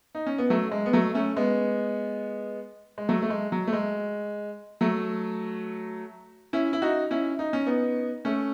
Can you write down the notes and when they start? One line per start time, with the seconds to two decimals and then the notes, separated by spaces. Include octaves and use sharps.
0.15 D#4
0.26 C#4
0.38 B3
0.50 F#3 A3
0.71 G#3
0.86 B3
0.93 F#3 A3
1.14 A3 C#4
1.36 G#3 B3
2.98 G#3
3.09 F#3 A3
3.22 A3
3.30 G#3
3.52 F#3
3.67 A3
3.73 G#3
4.81 F#3 A3
6.53 C#4 E4
6.73 E4
6.82 D#4 F#4
7.11 C#4 E4
7.39 D#4
7.53 C#4
7.67 B3 D#4
8.25 A3 C#4